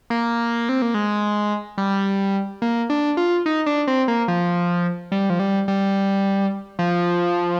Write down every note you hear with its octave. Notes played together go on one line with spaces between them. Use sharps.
A#3
C4
A#3
G#3
G3
A#3
D4
F4
D#4
D4
C4
A#3
F3
G3
F3
G3
G3
F3